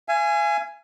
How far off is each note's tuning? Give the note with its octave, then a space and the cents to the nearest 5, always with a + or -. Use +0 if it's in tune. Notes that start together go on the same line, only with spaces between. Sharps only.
F5 -45 G#5 +0